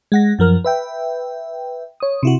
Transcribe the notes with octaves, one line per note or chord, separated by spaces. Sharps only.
G#3 F#5 A#6
F#2 F3 A#4 F6
B4 E5 G5
C#5 D#6
C3 E4 F#4